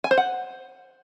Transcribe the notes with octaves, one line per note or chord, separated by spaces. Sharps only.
G#5
C5
F#5